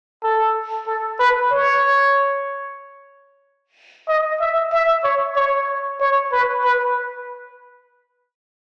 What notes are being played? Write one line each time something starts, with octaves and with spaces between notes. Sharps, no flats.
A4
A4
B4
C#5
D#5
E5
E5
C#5
C#5
C#5
B4
B4